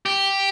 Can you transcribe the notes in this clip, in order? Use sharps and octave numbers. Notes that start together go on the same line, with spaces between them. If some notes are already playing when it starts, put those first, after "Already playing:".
G4